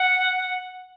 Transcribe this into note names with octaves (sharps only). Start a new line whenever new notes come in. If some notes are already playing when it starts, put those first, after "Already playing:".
Already playing: F#5